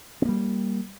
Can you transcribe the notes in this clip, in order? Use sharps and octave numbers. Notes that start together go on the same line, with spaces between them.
G3 A#3 C4